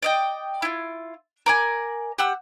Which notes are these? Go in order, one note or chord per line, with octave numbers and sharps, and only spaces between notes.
D5 D#5 G5
E4 F4
A#4 D5 G#5
G4 F#5 E6